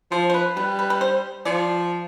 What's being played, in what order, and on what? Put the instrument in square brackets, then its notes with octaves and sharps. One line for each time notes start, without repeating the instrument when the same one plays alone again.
[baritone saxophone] F3 [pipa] C5
[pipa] C5
B4
[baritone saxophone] G3 [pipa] B4
[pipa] B4
B4
C5
[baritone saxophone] F3 [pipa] D5